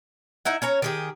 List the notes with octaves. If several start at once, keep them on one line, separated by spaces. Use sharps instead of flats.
D#4 E4 F#5
C#4 C#5 A#5
D#3 G4 G#4